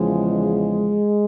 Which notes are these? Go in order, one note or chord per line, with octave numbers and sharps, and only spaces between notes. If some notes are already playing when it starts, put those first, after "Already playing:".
Already playing: E2 C#3 F3 G#3